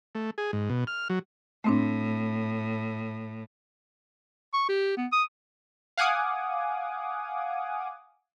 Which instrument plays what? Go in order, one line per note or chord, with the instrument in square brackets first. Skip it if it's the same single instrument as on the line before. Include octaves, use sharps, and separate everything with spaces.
[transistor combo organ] A3
G#4
G#2
B2
F6
F#3
[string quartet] A2 [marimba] A3 C4 D4
[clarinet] C#6
G4
B3
D#6
[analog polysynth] F5 F#5 G#5 D6 D#6